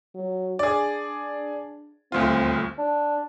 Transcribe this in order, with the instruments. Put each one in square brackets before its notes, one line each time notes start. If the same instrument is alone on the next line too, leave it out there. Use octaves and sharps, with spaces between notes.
[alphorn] F#3
[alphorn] D4 [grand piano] G#4 D5
[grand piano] D#1 D2 F4 [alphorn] C4
[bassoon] D4